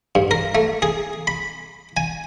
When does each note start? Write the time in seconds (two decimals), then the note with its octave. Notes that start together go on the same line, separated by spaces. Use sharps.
0.15 G2
0.31 A#4
0.55 A3
0.82 G#4
1.27 B5
1.97 G#5